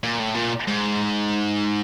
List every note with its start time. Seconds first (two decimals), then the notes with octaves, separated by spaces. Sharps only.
0.03 A#2
0.20 A2
0.35 A#2
0.68 G#2